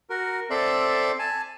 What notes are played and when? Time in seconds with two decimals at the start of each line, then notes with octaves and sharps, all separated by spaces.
0.10 F#4 A#4
0.50 C4 A4 D5 E5 C6
1.19 G#5 A5